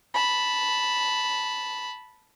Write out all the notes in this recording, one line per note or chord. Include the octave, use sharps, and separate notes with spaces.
A5 B5